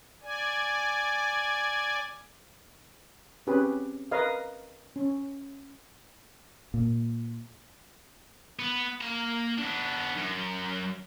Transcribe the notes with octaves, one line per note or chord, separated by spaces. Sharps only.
D5 G#5
C4 C#4 G4 G#4 B4
A#4 B4 D#5 F5
C#4
A#2
B3
A#3 A#5
B3 D4
F#2